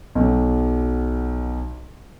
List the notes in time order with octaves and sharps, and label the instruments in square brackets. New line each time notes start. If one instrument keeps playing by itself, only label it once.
[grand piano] B1 F#3